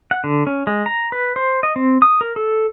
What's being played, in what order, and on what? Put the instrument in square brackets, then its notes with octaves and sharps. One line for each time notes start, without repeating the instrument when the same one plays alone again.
[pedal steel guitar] F#5
D3
C#4
G#3
A#5
B4
C5
D#5
C4
D#6
A#4
A4